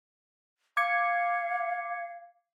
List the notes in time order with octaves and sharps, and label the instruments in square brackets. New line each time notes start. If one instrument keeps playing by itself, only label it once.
[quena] F5 [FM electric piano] D6 G#6 C#7